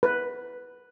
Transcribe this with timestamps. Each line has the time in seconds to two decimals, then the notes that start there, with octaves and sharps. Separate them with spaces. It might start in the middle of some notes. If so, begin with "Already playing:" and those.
0.03 B4